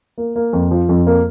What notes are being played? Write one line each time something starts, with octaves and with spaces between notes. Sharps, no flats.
A#3
A#3
F2
F3
F2
A#3